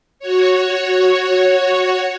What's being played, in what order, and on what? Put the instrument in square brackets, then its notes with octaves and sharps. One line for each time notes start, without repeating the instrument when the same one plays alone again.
[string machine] F#4 C#5